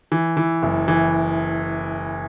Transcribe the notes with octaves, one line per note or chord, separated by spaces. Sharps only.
E3
E3
F#1
E3